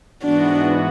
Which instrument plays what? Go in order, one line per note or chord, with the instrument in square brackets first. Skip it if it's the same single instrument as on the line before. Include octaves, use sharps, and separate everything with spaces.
[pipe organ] G#2 E3 B3 F#4 [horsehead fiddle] D4